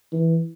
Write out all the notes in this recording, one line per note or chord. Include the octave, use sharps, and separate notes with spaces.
E3